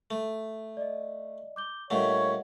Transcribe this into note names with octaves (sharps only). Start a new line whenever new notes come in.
A3
D5 D#5
D6 G6 G7
G2 A#2 A3 C#5 D#5 F5 F#5